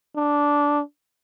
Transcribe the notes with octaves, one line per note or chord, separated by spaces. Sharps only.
D4